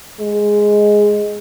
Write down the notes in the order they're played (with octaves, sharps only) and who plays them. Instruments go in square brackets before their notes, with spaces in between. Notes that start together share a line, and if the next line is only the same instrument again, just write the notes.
[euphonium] G#3